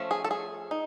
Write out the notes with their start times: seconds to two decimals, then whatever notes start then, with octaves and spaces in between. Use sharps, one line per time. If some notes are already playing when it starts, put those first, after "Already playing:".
Already playing: F3 A3 C#4
0.11 G#4
0.24 A4
0.31 G#4
0.71 D#4